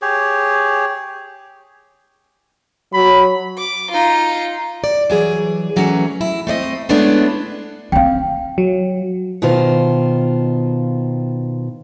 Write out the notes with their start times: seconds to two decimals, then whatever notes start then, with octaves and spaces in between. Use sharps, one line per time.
0.02 G4 G#4 C#5
2.94 F#3 B5
3.58 D6
3.91 D#4 F4
4.84 D5
5.10 E3 F#3 G#4
5.76 E3 F#3 A3 C#4 F#4
6.21 E4
6.47 A3 C4 D5 D#5
6.89 G#3 A3 B3 C#4 D4 E4
7.92 B3 C4 F5 G5
8.58 F#3
9.42 B2 D#3 F4 C5